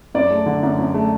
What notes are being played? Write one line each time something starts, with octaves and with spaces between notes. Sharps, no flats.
F#2 D5
A3
D3
F#2
F#2
A3